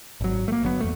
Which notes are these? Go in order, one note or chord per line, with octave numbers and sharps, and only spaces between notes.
G#1 F#3
A3 A#3
G1 F#3 B3
E2 A3